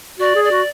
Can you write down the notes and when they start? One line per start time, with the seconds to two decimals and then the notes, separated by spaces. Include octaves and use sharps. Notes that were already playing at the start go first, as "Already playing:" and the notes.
0.20 F#4 D5
0.35 G#4
0.43 D5
0.51 F#4